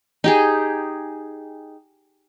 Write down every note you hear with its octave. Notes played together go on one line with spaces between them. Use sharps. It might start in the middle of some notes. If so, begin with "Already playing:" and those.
D#4 G4 G#4